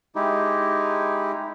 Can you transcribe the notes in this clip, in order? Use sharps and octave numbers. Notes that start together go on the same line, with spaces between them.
G#3 D#4 E4 G4